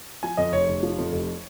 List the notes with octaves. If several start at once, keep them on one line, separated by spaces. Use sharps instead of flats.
F3 G#5
F2 D#5
F1 C#5
F1
F3
F2
F1